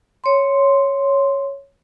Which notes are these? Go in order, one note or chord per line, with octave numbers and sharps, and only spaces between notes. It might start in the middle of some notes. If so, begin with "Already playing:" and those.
C#5 C6